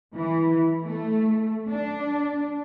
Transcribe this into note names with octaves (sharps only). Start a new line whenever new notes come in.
E3
A3
D4